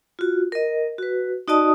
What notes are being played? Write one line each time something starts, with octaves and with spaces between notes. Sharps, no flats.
F4 F#4
A#4 D#5
F#4 B4
D#4 F#4 D5 D#5 A5 D#6